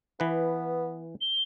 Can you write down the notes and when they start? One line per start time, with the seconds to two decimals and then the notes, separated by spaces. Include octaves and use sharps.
0.20 E3 B3 B4
1.21 G7